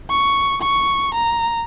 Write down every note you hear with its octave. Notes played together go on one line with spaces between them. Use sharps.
C#6
C#6
A#5